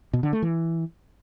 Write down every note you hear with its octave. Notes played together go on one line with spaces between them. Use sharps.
B2
D3
A3
E3